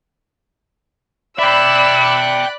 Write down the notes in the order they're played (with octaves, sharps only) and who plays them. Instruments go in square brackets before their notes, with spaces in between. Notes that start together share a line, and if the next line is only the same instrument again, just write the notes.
[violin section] D5 B5 F#6 [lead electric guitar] E5 G5 [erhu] E6